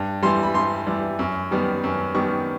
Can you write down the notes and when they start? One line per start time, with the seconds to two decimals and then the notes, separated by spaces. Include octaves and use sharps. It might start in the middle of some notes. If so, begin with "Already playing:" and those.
Already playing: G2
0.23 E3 G3 C6
0.43 B5
0.54 G2 C6
0.87 E3 G3
1.19 F#2
1.51 D#3 G3 B3
1.84 F#2
2.15 D#3 G3 B3 C#6